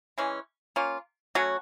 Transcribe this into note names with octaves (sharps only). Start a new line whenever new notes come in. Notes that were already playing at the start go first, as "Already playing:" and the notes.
E3 G#3 C#4
A#3 C#4 F4
F#3 A3 C#4 F#4